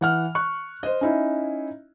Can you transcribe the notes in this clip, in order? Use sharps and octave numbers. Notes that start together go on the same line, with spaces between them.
E3 F#5 F6
C#6 F#6
C5 D#5
C#4 D#4 E4